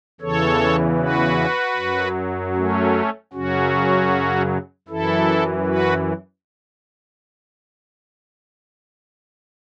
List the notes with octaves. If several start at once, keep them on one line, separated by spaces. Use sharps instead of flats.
E2 C#3 E3 A4 C#5
F#4 B4
F#2 F#3
A3 C#4
F#2 C#3 F#3 C#4 F#4
F#2 E3 E4 A4
F#4 B4